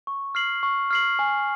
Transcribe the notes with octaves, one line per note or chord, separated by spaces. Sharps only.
C#6
F6 C7 F#7
C#6
F6 C7 F#7
G#5